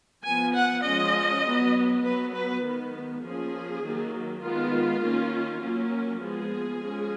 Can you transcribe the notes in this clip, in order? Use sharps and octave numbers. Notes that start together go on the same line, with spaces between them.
F3 B3 G#5
F#5
F3 G#3 C#4 D#5
F#3 B3
F#3 B3 B4
B4
D#3 G#3 B3
F3 A#3 C#4 G#4
D#3 F#3 A#3
D#3 G#3 B3 F4
D#3 A#3 C#4
F#3 A#3 C#4
F3 G#3 B3 G#4
F3 G#3 C#4